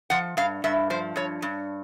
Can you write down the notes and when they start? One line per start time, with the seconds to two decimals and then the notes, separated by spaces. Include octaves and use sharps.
0.10 F3 F#5
0.37 G2 F5
0.64 G2 E5
0.90 F3 C5
1.16 G2 C#5
1.42 G2